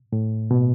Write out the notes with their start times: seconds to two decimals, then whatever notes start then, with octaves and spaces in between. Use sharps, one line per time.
0.13 A2
0.51 B2